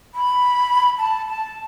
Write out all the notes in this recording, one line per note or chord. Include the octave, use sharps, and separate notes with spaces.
B5
A5
A5